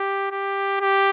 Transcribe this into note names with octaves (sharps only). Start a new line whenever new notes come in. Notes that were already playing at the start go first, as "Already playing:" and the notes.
Already playing: G4
G4
G4